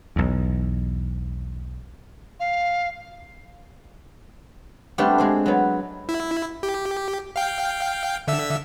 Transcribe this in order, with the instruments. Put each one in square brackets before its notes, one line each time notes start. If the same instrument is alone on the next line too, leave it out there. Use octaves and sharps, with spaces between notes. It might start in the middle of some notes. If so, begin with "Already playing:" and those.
[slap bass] B1 E2
[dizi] F5
[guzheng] G3 A3 B3 C4 D4 G4
G#3 C4 C5
F#3 B3
[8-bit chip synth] E4
G4
F5 G5
D3 E5 E6